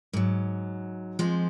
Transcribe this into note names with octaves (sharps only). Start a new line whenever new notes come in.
G#2 F#3
F2 F3 G#3